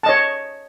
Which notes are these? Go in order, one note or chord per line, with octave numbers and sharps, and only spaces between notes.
C#5 D#5 A5